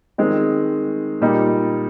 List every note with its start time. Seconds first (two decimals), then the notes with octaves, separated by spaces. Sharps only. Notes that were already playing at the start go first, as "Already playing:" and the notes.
0.18 D#3 G#3 C4
1.21 A#2 G3 A#3 D#4